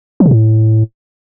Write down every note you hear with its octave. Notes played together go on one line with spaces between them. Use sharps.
F3
C3
A2